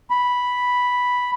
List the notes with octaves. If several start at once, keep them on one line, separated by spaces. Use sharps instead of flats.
B5